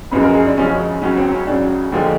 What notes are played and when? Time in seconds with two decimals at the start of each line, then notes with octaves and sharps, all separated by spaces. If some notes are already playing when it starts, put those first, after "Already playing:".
0.11 F#1 F#2 C#3 F3 G#3 B4
0.23 A#4
0.35 G#4
0.46 D4
0.57 F#1 F#2 C#3 F3 G#3 C#4
1.02 C#2 C#3 F#3 C#4
1.17 C4
1.32 C#4
1.47 C#2 C#3 F#3 D4
1.92 D#2 D3 F3 G#3